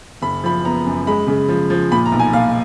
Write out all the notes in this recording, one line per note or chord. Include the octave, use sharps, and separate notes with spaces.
F#1 B5
F3 B5
B3 A#5
F#2
G#3 B5
C#3
F3
F3
A#2 B5
A#5
B1
G#5
A#2 F5